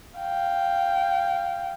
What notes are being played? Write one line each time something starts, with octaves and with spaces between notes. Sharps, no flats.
F5 G5